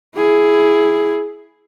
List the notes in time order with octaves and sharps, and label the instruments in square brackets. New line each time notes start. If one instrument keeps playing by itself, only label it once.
[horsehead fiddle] E4 G#4